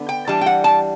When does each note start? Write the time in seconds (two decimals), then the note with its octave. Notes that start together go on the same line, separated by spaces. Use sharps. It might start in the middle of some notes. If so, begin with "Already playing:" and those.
Already playing: D3 B3
0.09 G5
0.27 E3 G3 D4 A5
0.41 G5
0.46 F#5
0.64 A5